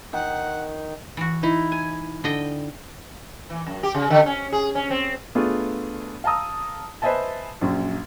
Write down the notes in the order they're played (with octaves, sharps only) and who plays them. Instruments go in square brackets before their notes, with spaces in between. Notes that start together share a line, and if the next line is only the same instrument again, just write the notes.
[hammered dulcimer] D#3 [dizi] F#5
[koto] E3 F#4
[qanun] D#4 E4
G#5
[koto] D3 D#5 G5
[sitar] E3
F#2
G4
C#3
D3
C#4
G#4
C#4
C4
[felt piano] A3 B3 D4 F4 G#4
F5 A5 A#5 D#6 E6
B4 C5 D#5 E5 G#5 A5
A#1 F#2